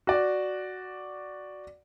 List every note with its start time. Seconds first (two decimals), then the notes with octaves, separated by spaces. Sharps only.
0.07 F#4 D5